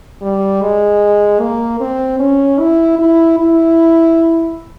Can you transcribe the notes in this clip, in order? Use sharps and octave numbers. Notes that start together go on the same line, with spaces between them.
G3
G#3
A#3
C4
C#4
E4
E4
E4